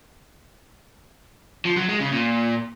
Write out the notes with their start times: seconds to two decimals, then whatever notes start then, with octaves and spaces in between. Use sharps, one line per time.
1.65 F3
1.77 F#3
1.89 G#3
2.00 C#3
2.12 A#2